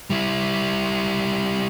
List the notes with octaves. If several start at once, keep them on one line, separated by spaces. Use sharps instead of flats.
G3 E4